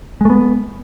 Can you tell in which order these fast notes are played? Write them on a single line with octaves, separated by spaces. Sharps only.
G#3 A3 B3